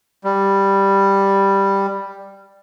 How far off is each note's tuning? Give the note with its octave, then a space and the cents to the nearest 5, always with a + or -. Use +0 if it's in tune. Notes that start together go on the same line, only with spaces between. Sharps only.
G3 +5